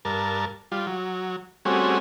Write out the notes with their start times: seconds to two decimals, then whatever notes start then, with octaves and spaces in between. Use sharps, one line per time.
0.05 G2 A#4 A5
0.72 G3 F4
0.87 F#3
1.65 G3 A3 C4 C#4 F#4 G#4